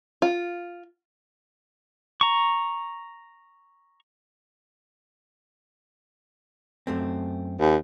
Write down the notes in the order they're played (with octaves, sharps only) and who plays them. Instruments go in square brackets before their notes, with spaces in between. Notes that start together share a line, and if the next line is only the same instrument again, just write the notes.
[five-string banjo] F4
[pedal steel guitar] A#5 C#6
[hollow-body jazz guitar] F#2 A3 C4
[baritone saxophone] D#2